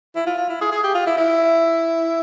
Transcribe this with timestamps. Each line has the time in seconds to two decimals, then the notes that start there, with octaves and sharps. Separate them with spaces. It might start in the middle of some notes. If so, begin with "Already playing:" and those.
0.16 E4
0.26 F4
0.37 F4
0.49 E4
0.61 G#4
0.72 G#4
0.84 G4
0.95 F4
1.06 E4
1.17 E4